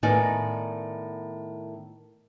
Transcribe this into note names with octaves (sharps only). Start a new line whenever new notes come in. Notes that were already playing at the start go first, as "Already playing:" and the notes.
A2 D#3 B3 D#4 D5 G#5